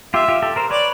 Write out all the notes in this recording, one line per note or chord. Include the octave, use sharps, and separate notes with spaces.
F4 G4 E5
F4 G4
G4 A4
A#4 C5
B4 C#5 D5